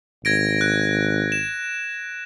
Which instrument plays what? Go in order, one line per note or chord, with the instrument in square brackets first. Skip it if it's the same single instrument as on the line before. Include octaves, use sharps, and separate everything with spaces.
[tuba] G#1 [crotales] G#6 A#6 D7
[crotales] F#6
E7